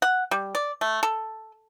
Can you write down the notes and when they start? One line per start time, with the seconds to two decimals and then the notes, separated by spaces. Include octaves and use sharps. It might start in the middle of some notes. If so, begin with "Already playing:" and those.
0.02 F#5
0.31 G3
0.55 D5
0.81 A3
1.03 A4